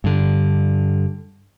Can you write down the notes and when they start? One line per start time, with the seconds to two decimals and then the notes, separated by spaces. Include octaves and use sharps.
0.04 G2 D3